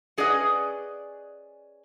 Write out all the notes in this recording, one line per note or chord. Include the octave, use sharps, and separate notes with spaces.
C#4 G#4 B4 D5 D#5 F#5